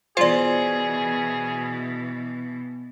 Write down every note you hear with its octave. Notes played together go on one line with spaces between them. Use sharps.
B2 E3 F4 G#4 C5 D5